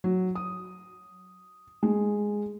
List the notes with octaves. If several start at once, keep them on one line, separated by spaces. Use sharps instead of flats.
F#3
D#6
G#3